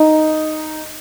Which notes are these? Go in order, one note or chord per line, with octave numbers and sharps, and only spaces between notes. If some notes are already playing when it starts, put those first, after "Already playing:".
Already playing: D#4